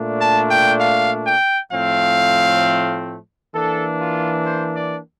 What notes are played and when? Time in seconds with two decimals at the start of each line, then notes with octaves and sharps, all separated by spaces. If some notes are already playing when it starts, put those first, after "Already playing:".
Already playing: A#2 A3 D4
0.20 A5
0.51 G5
0.80 F5
1.27 G5
1.72 A2 F3 A3 C4 F5
3.54 E3 A#3 D4 A4
4.00 F4
4.45 C5
4.76 D5